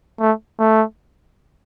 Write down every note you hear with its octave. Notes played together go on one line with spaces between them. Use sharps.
A3
A3